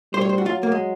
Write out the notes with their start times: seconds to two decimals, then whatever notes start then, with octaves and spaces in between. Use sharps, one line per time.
0.13 G3 C5
0.21 C#5
0.29 C5
0.38 F#4
0.46 F#3 F4
0.63 A#3
0.72 G#3